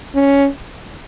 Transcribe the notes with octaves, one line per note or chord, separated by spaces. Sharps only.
C#4